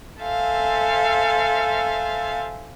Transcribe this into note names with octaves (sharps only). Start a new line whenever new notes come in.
A4 C5 E5 F5 G#5